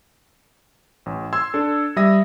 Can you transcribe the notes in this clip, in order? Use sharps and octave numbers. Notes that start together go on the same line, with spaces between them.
A1
C6 E6 G#6
D4 A4
G3 E5 D#6 A#6